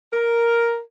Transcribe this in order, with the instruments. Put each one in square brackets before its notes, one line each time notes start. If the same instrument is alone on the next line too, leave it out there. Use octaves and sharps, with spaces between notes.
[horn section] A#4